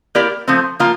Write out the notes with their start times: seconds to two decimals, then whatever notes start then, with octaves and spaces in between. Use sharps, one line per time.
0.15 A#3 E4 G4 A#4 D5
0.48 F3 A3 C4
0.79 F3 A#3 F4